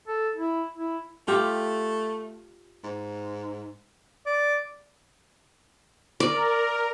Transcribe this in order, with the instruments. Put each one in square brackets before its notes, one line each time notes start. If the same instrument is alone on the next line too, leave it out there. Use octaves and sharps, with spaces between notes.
[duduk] A4
E4
E4
[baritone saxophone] A3 [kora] F4 G4
[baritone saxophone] G#2
[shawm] D5
[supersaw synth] A#4 [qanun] D5